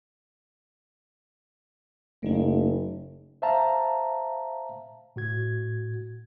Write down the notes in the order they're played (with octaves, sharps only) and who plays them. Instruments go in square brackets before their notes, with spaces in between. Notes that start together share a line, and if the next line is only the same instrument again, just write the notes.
[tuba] F#1 [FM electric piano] A3 D#4
[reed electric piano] C5 E5 F5 A5 A#5
A2 F#4 G#6